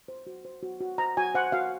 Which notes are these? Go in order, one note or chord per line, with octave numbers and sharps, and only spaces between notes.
C5
F#4
C5
F#4
F#4
C5 A#5
F#4 G#5
C5 F#5
F#4 F5